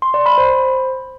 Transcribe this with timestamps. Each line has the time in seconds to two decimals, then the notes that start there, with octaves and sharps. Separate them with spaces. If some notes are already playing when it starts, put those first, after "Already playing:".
0.02 C6
0.14 D5
0.26 B5
0.38 C5